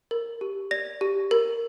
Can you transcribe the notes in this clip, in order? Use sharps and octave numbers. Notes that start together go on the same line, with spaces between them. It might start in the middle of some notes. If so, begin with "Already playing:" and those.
A#4
G4
D5 A#6
G4
A#4